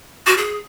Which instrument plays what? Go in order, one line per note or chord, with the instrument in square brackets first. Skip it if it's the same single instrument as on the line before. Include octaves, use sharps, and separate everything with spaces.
[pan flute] F#4
G#4